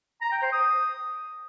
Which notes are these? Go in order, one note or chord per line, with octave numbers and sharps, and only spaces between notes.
A#5
G5
C5
D#6